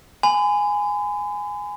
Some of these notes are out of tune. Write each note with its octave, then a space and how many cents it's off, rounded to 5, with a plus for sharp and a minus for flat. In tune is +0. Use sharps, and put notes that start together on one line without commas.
G#5 -5 B5 +45